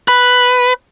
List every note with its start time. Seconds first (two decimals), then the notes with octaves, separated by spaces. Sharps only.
0.08 B4